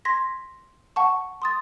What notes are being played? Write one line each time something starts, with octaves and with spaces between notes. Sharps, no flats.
C6 G#6 A#6 B6
F#5 A5 C#6
C6 D#6 A6